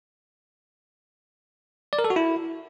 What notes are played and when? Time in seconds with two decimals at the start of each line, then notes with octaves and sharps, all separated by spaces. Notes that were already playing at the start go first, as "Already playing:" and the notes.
1.93 D5
1.99 A#4
2.04 A4
2.10 F#4
2.16 E4